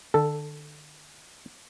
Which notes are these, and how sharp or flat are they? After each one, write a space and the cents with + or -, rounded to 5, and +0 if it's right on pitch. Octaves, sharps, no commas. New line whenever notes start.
D3 +35 A4 +0